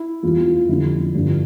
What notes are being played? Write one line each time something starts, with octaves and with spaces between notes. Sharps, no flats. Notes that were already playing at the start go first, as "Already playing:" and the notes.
Already playing: E4
E2 E3 G3 F4
F4
F2 D3 G3 E4
G2 D3 F3